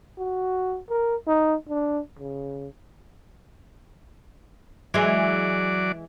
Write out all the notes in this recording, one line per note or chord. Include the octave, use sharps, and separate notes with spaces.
F#4
A#4
D#4
D4
C#3
E3 F#3 G#3 D5